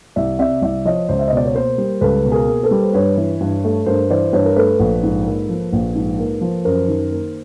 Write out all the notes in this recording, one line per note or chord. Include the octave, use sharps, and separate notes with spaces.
C2 D5 E5
C3 D5 E5
C2 D5 E5
F3 C#5 D#5
C#2 C5 D5
E5
B2 D#5
D5
C#5
A#3 A#4 C5
G3
C#2 A4 B4
B2
G#4 A#4
A#3
A4 B4
G3
C5
G2 B4 C#5
E3
G2
A3
G2 A#4 C5
E3 C5 D5
G2 B4 C#5
A#4
A3 A4 B4
A#1
G#2
A#3
F3
A#1
G#2
A#3
F3
F#2 A#4 C5
D#3
A#3